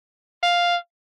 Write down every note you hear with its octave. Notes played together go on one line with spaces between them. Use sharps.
F5